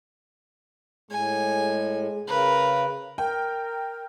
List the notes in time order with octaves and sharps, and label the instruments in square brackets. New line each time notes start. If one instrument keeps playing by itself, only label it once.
[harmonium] A2 [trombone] G#3 [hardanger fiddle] G#5
[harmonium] C#3 [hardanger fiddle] A#4 B4
[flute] A#4 [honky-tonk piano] G5